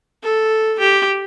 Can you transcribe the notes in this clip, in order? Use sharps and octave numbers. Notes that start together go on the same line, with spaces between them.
A4
G4